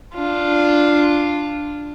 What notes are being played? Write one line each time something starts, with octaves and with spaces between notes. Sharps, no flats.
D4 F4